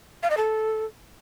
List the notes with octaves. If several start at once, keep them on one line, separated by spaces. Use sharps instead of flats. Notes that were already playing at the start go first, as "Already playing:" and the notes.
F5
D#5
A4